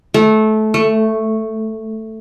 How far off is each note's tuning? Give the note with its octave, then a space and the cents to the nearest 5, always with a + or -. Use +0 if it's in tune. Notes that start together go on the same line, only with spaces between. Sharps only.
A3 -20
A3 +5